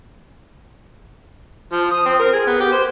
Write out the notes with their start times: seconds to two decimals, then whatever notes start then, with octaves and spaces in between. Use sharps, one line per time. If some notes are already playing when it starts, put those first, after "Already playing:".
1.72 F3
1.91 D#6
2.06 C4
2.19 A#4
2.33 G#4
2.47 B3
2.60 G4
2.72 C5